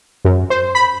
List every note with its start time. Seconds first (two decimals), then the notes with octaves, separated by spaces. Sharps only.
0.25 F#2
0.50 C5
0.75 B5